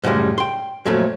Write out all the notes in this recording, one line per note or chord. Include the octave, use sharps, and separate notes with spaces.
F#2 A2 C#3 G3 G#3
G5 C6
F2 A#2 F#3 A3 C#4